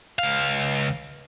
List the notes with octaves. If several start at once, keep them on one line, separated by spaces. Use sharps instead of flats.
C#2 F5